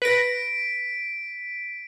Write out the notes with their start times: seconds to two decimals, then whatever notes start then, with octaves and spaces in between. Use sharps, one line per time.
0.02 B4 A#6 B6 D7